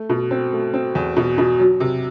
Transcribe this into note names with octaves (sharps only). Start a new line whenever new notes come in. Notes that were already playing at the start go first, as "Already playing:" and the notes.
Already playing: A3
B2
C4
A3
C4
E2
B2
B2
F#3
C3